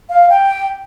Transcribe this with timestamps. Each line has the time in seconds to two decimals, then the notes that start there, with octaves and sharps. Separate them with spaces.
0.10 F5
0.30 G5